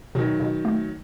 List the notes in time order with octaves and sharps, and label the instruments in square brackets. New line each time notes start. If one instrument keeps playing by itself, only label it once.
[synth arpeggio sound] B2 [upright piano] D#3 F#3
[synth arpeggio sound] B2
A3